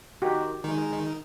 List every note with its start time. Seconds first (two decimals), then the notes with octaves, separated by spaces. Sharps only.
0.22 D#3 F#4 G4
0.64 D#3 G#3 D#4